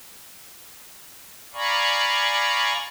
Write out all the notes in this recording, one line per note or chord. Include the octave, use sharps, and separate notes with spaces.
D5 F5 G#5 A#5 B5 C#6